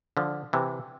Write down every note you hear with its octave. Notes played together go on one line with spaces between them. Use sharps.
D3 F3
C3 E3